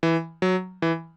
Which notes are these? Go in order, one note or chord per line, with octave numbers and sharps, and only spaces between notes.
E3
F#3
E3